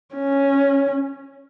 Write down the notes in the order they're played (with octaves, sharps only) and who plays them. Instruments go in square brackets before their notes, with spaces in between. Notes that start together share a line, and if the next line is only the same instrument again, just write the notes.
[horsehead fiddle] C#4